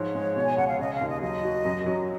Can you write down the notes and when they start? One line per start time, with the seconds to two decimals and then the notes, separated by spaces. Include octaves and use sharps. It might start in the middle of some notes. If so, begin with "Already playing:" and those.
Already playing: G#2 F3 C#5
0.15 G#3
0.36 B2
0.44 G#5
0.56 C#2 F#5
0.67 F5
0.78 C#3 D#5
0.94 F5
1.01 D#2
1.07 D#5
1.22 F#3 D#5
1.43 F#4
1.65 F#2
1.86 F#3